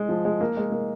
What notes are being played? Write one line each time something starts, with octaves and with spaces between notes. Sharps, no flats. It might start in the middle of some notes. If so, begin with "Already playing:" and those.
Already playing: G#3
F3
G#3
A#3
G#3
A#3